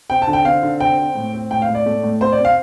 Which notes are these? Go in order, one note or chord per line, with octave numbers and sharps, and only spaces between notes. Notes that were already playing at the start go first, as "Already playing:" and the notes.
C4 G5
A5
D3
G5
C4 F5
D3
C4 G5
C4
A2
C4
A2 G5
F5
A2
D5
A3
A2
C4 C5
D5
C4
F5